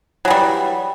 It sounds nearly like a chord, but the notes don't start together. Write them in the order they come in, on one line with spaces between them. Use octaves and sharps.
F#3 E3 G3